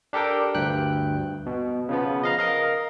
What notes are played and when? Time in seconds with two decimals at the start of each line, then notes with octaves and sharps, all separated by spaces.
0.13 D4 G4 A4 A#4 G5
0.55 D2 G2 G5 F#6
1.46 B2
1.89 C#3 F3 B3
2.23 D#5 F5 A#5
2.39 A#4 D#5 F5